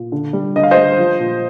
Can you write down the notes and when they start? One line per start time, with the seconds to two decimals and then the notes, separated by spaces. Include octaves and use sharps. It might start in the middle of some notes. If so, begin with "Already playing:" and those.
Already playing: A#2
0.12 D3
0.33 G3
0.56 D3 D#5
0.63 F5
0.71 C5 D#5
0.77 G3
0.98 F3
1.20 A#2